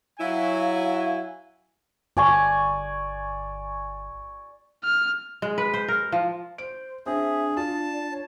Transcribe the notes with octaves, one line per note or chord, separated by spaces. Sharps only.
F#3 E4 F5 G#5
G1 D5 G#5 C#6
F6
G#3
B4
C5
A#4
F3
C5 D7
C4 D4 G#4 E5
F4 D5 A5
C#5